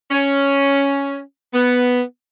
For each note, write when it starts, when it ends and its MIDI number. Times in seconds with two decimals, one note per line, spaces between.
0.11 1.20 61
1.53 2.01 59